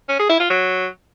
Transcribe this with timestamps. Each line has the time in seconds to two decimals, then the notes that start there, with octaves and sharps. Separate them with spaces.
0.09 C#4
0.19 G#4
0.29 E4
0.40 F4
0.50 F#3